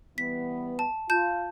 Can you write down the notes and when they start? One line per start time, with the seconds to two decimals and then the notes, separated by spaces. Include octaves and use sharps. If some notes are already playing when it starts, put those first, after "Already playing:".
0.18 E3 G3 B3 B6
0.79 A5
1.10 F4 A5 G6